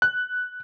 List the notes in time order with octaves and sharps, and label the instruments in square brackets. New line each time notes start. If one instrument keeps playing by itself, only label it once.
[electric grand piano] F#6